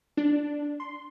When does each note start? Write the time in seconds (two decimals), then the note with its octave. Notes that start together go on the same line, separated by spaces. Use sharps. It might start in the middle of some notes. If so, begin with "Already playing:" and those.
0.17 D4
0.80 C6